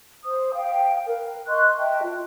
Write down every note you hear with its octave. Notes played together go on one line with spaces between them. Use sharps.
C5 D#6
F5 G5
A#4 B4
D#5 C6 C#6 F#6
D#5 E5 G5 A5
F4